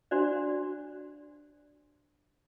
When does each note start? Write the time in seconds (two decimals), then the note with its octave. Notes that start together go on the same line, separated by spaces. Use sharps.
0.11 D4 F#4 C5 D5